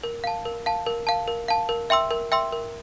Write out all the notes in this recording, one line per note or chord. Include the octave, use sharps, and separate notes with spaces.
A#4
F5 A5
A#4
F5 A5
A#4
F5 A5
A#4
F5 A5
A#4
E5 G5 C6 E6
A#4
E5 G5 C6 E6
A#4